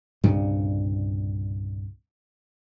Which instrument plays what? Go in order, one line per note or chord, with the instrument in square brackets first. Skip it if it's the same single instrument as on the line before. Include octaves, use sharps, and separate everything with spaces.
[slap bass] C2 G2 A#2 C#3